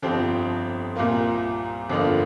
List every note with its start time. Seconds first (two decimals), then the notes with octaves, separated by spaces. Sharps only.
0.02 G1 F2 F3 C4 G4
0.95 C2 A#2 A#3 F4
1.89 G1 F2 D3 A#3 F4